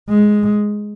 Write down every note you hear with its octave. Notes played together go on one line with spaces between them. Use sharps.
G#3